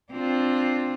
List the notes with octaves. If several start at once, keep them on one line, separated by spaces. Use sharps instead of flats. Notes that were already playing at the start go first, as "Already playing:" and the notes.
C4 D4 F4